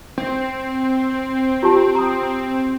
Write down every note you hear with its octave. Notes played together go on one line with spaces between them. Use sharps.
C4
F4 G4 A5
A#5 D#6